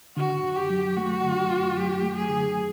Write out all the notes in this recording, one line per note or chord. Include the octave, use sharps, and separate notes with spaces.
D3 F#4
F#2
G4
F#3
A3 F#4
D3
F#2
F#3 G4
A3
G#4
D3